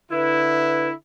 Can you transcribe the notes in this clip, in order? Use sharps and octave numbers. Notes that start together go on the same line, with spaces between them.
D3 E4 B4